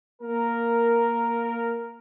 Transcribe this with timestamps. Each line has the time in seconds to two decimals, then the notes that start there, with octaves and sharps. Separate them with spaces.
0.22 A#3 A#4